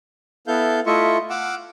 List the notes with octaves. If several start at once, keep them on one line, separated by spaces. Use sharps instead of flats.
B3 E4 A4 F5 G6
A3 E4 F4 D#5 E5 C#6
F5 F#5 D6 E6